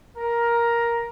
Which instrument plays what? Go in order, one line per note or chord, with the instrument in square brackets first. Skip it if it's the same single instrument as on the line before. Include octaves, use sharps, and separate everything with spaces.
[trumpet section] A#4